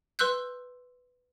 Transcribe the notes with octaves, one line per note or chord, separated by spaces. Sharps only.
B4 C6 E6 F#6 G6